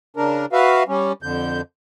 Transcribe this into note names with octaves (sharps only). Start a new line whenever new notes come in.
C#3 D4 A#4
F#4 B4 E5 F5
G3 C#4
F2 D3 G6